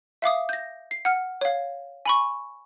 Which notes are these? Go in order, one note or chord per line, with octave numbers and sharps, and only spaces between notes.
E5 F5 D6 D#6
G6 A#6
C7
F#5 F6
C#5 F5
G#5 B5 C#6